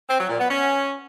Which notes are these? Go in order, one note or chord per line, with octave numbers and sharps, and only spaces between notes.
C4
F#3
A#2
B3
C#4